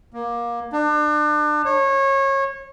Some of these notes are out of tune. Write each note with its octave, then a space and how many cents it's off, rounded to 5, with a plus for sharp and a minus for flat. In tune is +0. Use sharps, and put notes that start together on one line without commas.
A#3 +20
D4 +35
C#5 -25